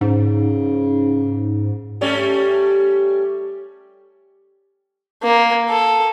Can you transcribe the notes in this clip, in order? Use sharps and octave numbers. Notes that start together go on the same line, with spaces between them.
G#2 C#3
G3 A3 C#4
A#3
A4